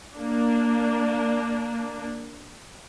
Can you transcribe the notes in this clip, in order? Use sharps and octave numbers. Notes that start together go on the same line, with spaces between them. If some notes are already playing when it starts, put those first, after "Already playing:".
A#3 D4